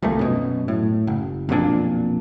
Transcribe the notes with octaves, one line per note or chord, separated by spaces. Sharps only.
D#1 C2 A#2 A3
F#2 B2
A2
F#1
B1 F2 A#2 D4